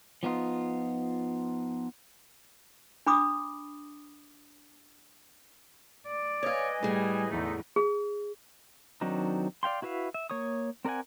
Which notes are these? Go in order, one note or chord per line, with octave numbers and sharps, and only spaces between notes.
F3 B3 D#4 F4
D4 B5 D6 D#6
D5
B4 C#5 D#5 F5 G#5
A2 G3 G#4
E2 D3 A3 D#4
G#4
D#3 F#3 C4 D4 D#4
D5 F5 G5 C6
E4 F#4 B4 E5 F5
E5
A#3 C#5 C#6 D#6
C4 A#4 D5 F#5 G#5